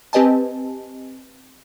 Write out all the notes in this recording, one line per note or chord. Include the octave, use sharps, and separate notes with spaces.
C4 G4 B4 D#5 G#5 A5